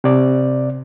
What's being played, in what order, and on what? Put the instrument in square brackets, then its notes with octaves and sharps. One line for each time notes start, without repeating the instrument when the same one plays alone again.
[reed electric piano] C3 D5